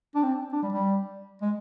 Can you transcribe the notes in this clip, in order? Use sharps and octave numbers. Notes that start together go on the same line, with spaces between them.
D4
C4
D4
G3
G3
G#3